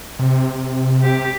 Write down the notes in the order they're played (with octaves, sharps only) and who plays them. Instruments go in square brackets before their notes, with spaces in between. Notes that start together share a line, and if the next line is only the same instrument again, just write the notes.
[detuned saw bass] C3
[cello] G4